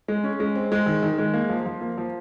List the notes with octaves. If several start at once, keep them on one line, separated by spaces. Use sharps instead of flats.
G#3
C#4
G#3
C4
G#3
D#3
D#3
G#3
A#3
F3
F3
A#3
F3